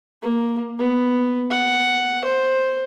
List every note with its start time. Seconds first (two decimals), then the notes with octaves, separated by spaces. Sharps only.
0.22 A#3
0.79 B3
1.51 F#5
2.24 C5